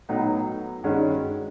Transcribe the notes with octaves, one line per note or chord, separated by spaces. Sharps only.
A2 F#3 B3 D#4
G2 D#3 G#3 C#4 F#4